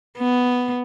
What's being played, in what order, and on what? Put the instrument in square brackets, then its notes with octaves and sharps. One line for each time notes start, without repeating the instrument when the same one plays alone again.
[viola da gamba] B3